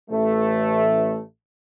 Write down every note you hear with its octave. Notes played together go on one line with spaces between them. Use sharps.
A1 A3